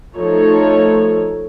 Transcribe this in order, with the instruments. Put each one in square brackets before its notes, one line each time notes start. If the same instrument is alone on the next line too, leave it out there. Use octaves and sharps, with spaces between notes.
[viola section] F3 A3 D#4 A4 C#5